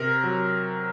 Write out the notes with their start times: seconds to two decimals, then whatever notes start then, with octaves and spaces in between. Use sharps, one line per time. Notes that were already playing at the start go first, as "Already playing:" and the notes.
Already playing: C3 A#4
0.24 F#3